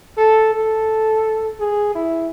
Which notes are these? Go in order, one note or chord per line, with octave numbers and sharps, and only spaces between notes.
A4
A4
G#4
E4